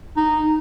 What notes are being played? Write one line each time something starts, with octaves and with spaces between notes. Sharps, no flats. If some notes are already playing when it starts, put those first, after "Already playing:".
D#4